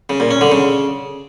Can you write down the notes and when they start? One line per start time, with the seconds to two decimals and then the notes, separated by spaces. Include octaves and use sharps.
0.10 C#3
0.20 A#2
0.31 C#4
0.41 D3
0.52 C#3